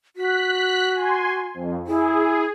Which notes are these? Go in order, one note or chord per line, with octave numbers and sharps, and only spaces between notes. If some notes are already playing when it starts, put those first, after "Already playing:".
F#4 F#6 B6
G#5 C6
F2
E4 G#4